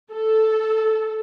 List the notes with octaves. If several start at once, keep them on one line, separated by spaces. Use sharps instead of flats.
A4